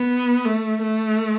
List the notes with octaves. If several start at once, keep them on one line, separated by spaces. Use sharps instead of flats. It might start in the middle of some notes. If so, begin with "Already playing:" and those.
Already playing: B3
A3
A3